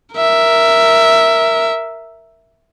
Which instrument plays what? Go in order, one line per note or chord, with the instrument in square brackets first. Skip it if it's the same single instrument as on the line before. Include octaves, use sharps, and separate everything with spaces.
[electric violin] A#4 E5